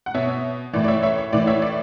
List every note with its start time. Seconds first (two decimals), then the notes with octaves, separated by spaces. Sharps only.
0.06 F#5
0.14 B2 C#5 E5
0.73 A2 E3 D5
0.84 D5
0.88 C#5 E5
1.03 C#5 E5
1.18 C#5
1.33 A2 E3 D5
1.47 C#5 E5
1.62 D5